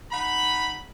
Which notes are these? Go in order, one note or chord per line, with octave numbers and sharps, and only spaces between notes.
D#4 F#5 B5